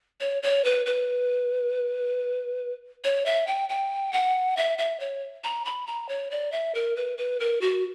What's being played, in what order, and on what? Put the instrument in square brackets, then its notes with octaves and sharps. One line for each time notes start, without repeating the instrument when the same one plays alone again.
[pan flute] C#5
C#5
B4
B4
C#5
E5
G5
G5
F#5
E5
E5
C#5
A#5
B5
A#5
C#5
D5
E5
A#4
B4
B4
A#4
F#4